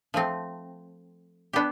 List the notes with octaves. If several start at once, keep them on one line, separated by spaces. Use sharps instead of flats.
F3 A3 C4
B3 D4 G4